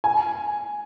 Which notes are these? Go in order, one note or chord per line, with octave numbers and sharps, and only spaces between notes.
G#5